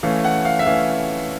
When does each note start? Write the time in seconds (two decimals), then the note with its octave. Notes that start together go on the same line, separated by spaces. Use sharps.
0.03 E3 A3 C#4 F5
0.24 F#5
0.45 F5
0.59 E5
0.66 E3 A3 C#4 F5